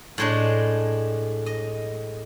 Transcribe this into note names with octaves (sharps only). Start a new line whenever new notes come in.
A2 G#3 D4
D#5